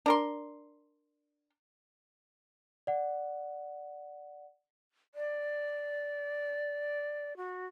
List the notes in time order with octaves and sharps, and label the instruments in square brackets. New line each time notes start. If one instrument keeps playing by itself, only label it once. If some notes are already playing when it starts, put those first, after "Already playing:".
[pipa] D4 A#4 C6
[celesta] D5 F#5
[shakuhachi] D5
F#4